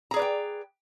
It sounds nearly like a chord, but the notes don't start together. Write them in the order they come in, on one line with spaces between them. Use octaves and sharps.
A#5 G#4 D5 B4 G5